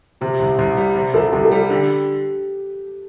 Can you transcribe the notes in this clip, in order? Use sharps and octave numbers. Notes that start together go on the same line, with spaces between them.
C3 G4
C2
C2
G3
C3
C2 A4
C2 G4
A4
G3
A4
D3 G4